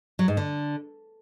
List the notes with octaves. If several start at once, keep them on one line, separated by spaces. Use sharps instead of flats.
F#3
G#2
D3